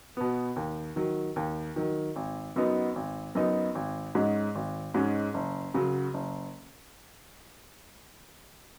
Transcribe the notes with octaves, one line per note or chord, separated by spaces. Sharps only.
B2 B3
D#2
D#3 F#3
D#2
D#3 F#3
G#1
F#2 F#3 B3 D#4
G#1
F#2 F#3 B3 D#4
G#1
G#2 G#3 C#4
G#1
G#2 G#3 C#4
F#1
F#2 C#3 F#3
F#1